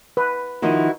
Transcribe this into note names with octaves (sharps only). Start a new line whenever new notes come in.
B4
D#3 F3 D#4 E4 F#4